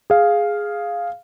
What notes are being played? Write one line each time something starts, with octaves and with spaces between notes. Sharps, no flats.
G#4 F5